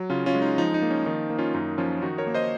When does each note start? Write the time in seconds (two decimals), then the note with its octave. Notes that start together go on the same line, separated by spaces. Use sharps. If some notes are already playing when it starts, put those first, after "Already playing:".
Already playing: F#3
0.10 C#3 C#4 F4
0.26 C#4 F4
0.35 G#3
0.42 D#4
0.58 F3 D#4
0.74 D#4
0.82 A#3
0.90 C#4
1.06 D#3 D#4
1.30 A#3
1.39 C#4 F4
1.54 F#2 D#4
1.78 F3 C#4 F4
2.02 D#3 D#4 F#4
2.18 A#4 C#5
2.27 A#3
2.34 C5 D#5